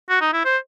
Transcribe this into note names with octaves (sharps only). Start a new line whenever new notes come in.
F#4
D#4
E4
C5